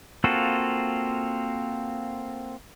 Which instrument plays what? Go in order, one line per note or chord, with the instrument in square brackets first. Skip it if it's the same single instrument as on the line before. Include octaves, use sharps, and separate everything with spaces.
[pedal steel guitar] A#3 C4 F4 F#4 A4